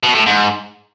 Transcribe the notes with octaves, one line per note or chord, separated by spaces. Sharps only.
B2
A2
G#2